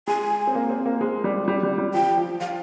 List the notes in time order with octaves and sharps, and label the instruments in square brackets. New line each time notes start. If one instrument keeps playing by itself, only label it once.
[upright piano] G#3 [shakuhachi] G#5
[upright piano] C4
A#3
C4
A#3
G#3
G3
G3
G3
G3
[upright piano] F3 [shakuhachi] G5
[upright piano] F3
[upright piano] F3 [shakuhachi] F5